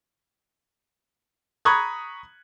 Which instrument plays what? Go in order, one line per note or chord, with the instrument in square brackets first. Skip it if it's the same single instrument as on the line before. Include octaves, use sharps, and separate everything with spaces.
[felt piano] A#5 B5 C#6 D#6 F#6 G#6